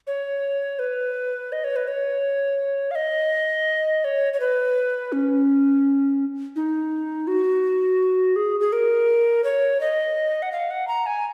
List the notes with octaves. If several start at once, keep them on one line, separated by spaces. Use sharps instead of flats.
C#5
B4
D#5
C#5
B4
C#5
F5
D#5
C#5
C#5
B4
C#4
D#4
F#4
G#4
G#4
A#4
C#5
D#5
F#5
F5
F#5
A#5
G#5